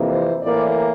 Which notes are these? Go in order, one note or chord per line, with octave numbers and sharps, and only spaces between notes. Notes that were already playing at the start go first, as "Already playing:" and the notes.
Already playing: F2 C3 E3 A#3
C5
A2 E3 A#3 D5